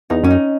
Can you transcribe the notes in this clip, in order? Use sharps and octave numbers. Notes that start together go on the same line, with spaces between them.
E2 D#4
F#2 C#4
D#4